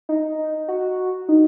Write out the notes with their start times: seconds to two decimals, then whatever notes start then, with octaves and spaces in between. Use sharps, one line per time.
0.09 D#4
0.68 F#4
1.29 D#4